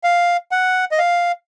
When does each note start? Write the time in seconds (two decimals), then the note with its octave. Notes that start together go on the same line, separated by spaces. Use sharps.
0.04 F5
0.51 F#5
0.91 D#5
0.99 F5